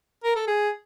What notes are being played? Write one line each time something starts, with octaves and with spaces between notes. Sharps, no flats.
A#4
A4
G#4